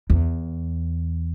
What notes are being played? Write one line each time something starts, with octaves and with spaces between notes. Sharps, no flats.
E2